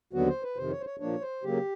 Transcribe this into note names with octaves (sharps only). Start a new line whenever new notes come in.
D#2 D3 F#3 B3 F#4
C5
B4
F2 C3 D#3 C5
C#5
C5
C#5
A#2 F3 A#3 D4 C#5
C5
C#3 F#3 A#3 G4